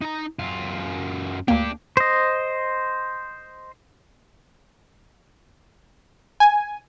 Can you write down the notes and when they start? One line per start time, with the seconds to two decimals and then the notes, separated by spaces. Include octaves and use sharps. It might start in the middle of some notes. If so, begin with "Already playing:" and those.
0.02 D#4 A#5
0.39 F#2 F4
1.48 D2 A#3 D4 G4
1.97 C5 D#5
6.40 G#5